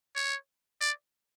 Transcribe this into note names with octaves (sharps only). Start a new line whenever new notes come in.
C#5
D5